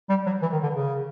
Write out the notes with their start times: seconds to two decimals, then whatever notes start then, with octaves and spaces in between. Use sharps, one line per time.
0.09 G3
0.26 F#3
0.42 E3
0.52 D#3
0.63 D3
0.75 C#3